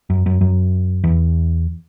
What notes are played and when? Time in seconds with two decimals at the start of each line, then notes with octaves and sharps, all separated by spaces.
0.10 F#2
0.26 F#2
0.41 F#2
1.04 E2